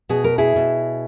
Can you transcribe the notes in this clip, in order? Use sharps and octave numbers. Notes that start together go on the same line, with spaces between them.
B2 G#4
A#4
E4 G#4
B2